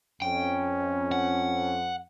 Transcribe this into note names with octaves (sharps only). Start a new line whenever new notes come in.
F2 C#4 G5
F#5